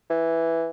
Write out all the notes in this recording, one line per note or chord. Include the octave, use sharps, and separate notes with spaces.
E3